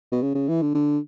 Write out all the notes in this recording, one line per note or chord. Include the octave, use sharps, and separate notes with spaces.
B2
C#3
C#3
E3
D3
D3